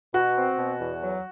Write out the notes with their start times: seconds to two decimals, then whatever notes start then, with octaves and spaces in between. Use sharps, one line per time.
0.14 B2 F#4
0.37 C4
0.58 B2
0.80 E2
1.02 F#3